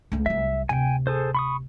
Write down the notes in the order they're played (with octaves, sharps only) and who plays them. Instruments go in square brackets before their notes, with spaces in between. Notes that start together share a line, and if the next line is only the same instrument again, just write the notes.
[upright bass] C#2 A3
[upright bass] C2 F#3 [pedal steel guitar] E5
[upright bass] D1 C3 [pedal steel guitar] G5 G#5
[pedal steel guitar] G#4 A4 C5
B5 C#6 D#6